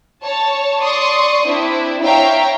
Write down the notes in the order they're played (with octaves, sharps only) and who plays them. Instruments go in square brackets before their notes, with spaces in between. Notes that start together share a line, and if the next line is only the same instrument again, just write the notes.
[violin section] C#5 A5
D5 C6 C#6 D#6
C4 D4 E4
C#5 E5 F5 G5 A#5